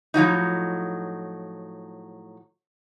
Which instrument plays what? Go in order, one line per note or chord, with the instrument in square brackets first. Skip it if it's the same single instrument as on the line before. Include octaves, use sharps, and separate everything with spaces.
[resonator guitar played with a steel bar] A2 F3 F#3 D#4